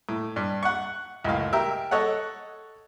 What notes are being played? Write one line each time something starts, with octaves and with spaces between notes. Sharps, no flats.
A2
G2
F#5 C#6
C#2 F#2 A2 F5
G4 A#4 E5
A4 C#5 D#5 F#5